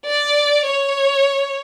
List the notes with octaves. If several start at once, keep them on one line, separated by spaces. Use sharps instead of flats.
D5
C#5